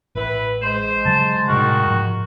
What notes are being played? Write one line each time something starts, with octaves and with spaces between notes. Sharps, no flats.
A1 E4 B4
G#3 C5
C#3 F#3 G3 A5
A2 C3 D#3 G3 F#4
G#2 E3 F3